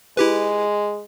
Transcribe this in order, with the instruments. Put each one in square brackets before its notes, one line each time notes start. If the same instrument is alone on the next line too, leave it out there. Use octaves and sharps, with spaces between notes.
[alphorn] G#3 [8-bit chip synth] E4 G4 B4